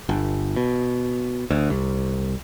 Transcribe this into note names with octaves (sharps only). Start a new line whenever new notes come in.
G1
B2
D2
C2